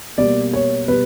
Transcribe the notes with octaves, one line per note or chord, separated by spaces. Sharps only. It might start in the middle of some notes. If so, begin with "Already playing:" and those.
B2 G3 A#3 D5
C#5
B2 G3 B4